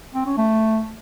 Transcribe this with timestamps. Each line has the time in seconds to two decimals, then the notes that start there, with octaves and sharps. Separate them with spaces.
0.14 C4
0.26 C#4
0.37 A3